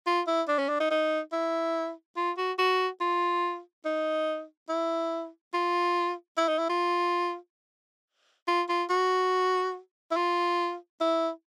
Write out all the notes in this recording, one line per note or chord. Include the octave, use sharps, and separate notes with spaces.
F4
E4
D4
C#4
D4
D#4
D#4
E4
F4
F#4
F#4
F4
D#4
E4
F4
E4
D#4
E4
F4
F4
F4
F#4
E4
F4
E4